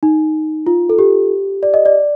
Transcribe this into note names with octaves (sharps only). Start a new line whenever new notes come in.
D#4
F4
A4
G4
D5
D#5
D5